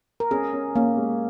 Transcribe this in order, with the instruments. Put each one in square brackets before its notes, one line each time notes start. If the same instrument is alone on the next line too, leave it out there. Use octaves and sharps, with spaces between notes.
[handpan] A#4
[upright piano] C#4 [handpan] G#4
[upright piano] C#4
[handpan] A#3 [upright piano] C#4
[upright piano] G#3